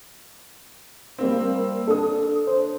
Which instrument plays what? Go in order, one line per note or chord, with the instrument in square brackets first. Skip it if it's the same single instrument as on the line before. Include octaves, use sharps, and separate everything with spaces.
[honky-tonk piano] G3 A#3 C4
[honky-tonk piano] D4 D#6 [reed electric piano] A4
[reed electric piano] C5